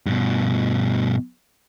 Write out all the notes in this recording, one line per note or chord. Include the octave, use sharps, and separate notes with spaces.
G2 B2